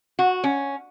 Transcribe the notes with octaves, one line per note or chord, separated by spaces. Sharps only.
F#4
C#4